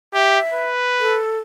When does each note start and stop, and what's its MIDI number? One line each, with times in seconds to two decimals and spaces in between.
0.14 0.39 67
0.14 0.66 76
0.54 1.20 71
1.00 1.39 69